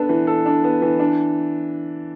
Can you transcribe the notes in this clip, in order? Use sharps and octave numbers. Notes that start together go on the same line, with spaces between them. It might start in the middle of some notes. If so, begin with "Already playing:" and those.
Already playing: B3 D4 A4
E3
A4
D4
B3
E3
D4